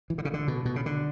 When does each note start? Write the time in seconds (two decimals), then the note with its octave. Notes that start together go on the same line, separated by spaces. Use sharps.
0.10 E3
0.18 D3
0.25 C#3
0.34 D3
0.48 B2
0.65 B2
0.76 C#3
0.86 D3